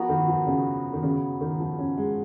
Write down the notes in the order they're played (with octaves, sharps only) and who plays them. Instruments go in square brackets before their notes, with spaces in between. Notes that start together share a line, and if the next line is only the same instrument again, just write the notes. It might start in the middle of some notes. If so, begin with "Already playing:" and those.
Already playing: [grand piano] F3 [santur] B3 F#4 A#4
[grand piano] D#3
F3
C#3
D#3
C#3
D#3
F3
C#4
G#3